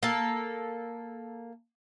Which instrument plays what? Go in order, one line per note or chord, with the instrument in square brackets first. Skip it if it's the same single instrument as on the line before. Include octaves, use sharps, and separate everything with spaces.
[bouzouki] A#3 A4